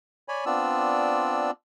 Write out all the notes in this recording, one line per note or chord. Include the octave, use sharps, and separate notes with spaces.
C#5 D5 G#5 B5
B3 C4 D4 F4 D5 E6